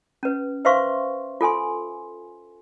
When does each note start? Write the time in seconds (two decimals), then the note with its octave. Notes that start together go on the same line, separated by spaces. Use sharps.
0.23 C#4 B4
0.65 B4 C5 E5 F5 C6 C#6
1.41 F4 A4 G#5 C6